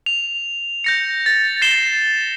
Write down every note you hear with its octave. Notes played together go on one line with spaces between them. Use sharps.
F7
G6 A#6 C#7
A6
A6 C7 E7 G7